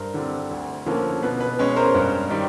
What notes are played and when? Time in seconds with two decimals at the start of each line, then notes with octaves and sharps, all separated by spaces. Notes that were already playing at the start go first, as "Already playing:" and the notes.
Already playing: G2 A#4 C5
0.14 D3 G3 C4
0.51 D2
0.86 D3 F3 A#3 C#4
1.22 B2 B4
1.40 B4
1.59 G#3 C#4
1.76 A#4 C5
1.94 G2
2.30 D#3 G3